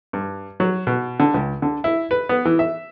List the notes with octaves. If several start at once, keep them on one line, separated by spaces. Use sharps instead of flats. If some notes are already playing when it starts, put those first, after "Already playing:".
G2
F#3
B2
D3
C#2
D3
E4
B4
B3
E3
E5